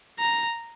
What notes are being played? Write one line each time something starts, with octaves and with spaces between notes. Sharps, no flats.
A#5